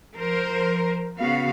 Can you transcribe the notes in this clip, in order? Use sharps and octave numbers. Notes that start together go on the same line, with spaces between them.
F3 A#4 C5
C#3 B3 F#4 F5